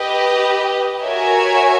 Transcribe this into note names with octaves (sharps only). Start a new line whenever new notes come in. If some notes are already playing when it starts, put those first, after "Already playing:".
Already playing: G4 B4 D#5
F#4 A#4 C#5 E5 G#5